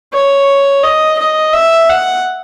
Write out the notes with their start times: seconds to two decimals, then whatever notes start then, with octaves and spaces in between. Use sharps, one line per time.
0.13 C#5
0.83 D#5
1.19 D#5
1.53 E5
1.89 F#5